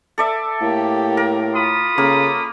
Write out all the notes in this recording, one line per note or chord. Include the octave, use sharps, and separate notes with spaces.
A4 D5 E5
A2 A#3 G4
A#4
F4 B5 D#6
C#3 A#3 A4